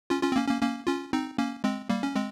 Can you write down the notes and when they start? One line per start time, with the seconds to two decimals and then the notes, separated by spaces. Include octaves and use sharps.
0.10 C#4 F4
0.23 C#4 F4
0.32 C4
0.36 A#3 C#4
0.48 A#3 C#4
0.62 A#3 C#4
0.87 C#4 F4
1.13 C4 D#4
1.38 A#3 C#4
1.64 G#3 C4
1.89 G3 A#3
2.03 C#4
2.15 G#3 C4